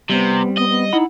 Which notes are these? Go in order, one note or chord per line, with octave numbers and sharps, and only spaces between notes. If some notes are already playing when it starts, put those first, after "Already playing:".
C3 G3 B3 C4
B3 D#5
B3
D#4 E4 F#5 B5